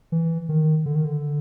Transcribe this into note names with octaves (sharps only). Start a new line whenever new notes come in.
E3
D#3
D3
D#3
D3